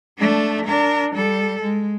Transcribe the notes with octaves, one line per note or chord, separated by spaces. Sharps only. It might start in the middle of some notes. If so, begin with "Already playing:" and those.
A3 D4
D4 A#4
G3 A4
G#3